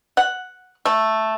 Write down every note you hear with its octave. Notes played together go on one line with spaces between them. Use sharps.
F#5
A3